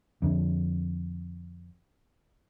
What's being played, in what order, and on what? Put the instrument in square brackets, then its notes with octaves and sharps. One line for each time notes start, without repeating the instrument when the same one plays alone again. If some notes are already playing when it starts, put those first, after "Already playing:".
[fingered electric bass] F2 D3